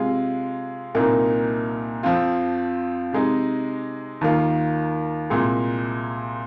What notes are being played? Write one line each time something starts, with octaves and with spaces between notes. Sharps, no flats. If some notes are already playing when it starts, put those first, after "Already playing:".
Already playing: C3 G#3 F4
C2 A#2 A#3 D#4
F2 F3 C4 F4
C3 G#3 D#4
D#2 D#3 A#3 F4
C2 A#2 G#3